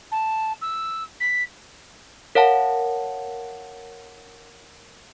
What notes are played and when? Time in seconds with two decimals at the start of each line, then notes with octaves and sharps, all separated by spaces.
0.11 A5
0.61 E6
1.20 B6
2.35 A#4 C#5 F5 F#5 A5